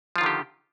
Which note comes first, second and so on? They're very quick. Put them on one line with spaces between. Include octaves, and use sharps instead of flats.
F3 F4 D#3 D3 G4